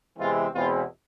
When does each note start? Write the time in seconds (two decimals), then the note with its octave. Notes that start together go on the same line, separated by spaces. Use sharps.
0.18 E2 C3 E3 G#3 C4 F4
0.54 E2 B2 G#3 C4 E4 F4